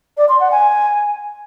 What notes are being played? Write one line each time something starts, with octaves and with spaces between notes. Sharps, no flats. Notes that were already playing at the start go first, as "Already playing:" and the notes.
D5
C6
F#5
G#5